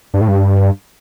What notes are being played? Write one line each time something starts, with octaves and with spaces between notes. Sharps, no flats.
G2
A2
G2